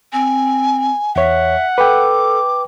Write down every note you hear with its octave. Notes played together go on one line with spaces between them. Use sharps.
C4 G#5
E2 C#5 E5 F#5
A4 B4 G5 D6